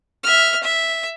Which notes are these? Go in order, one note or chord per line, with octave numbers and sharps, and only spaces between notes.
E5 F6
E5